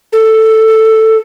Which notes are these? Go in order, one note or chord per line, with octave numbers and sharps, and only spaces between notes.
A4